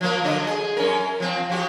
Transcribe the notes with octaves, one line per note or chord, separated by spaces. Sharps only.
F3 F#3 A#3
D3 F#3 D#5
G#4
F#2 C#4 A#4
F3 C4
F3 F#4 G4